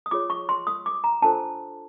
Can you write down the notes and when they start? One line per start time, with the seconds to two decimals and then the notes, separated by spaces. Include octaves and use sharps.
0.06 D#6
0.11 F4 G#4 C#5 D6
0.30 C#6
0.49 C6
0.67 D#6
0.86 D6
1.04 A#5
1.22 D4 F4 A4 C5 A5